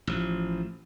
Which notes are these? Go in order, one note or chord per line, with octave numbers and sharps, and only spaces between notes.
A1 F3